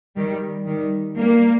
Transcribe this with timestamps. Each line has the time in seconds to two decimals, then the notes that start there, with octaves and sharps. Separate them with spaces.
0.16 D#3 G3
0.66 D#3 G3
1.17 G3 A#3